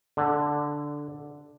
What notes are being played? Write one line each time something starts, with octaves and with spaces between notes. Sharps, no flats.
D3